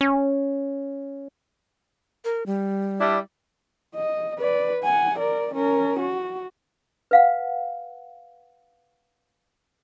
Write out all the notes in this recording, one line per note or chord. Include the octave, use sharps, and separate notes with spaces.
C#4
A#4
G3
G3 D4 E4 D5
D#5
B4 D5
F#5 G#5
A#4 D5
C#4 A#4
F#4
B4 F5 F#5